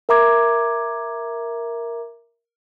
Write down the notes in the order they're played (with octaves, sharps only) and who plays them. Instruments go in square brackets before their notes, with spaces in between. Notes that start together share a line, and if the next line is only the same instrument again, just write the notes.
[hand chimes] A#4 E5 A#5 D6 G#6